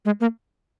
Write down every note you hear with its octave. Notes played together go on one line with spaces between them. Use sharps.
G#3
A#3